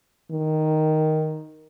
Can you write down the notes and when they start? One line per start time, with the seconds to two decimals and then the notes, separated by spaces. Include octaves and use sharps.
0.31 D#3